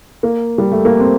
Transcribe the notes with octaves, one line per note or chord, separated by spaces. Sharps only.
A#3
G3
A3
A#3
C4